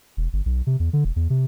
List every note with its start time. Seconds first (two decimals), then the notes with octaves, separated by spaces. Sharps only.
0.17 E1
0.33 G1
0.46 B1
0.67 C3
0.80 E2
0.93 D3
1.04 E1
1.16 E2
1.30 C3